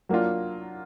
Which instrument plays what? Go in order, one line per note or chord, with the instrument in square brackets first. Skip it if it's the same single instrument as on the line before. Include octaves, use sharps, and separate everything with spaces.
[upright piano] F#3 A#3 D4 F4